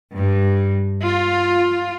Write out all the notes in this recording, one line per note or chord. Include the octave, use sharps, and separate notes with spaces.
G2
F4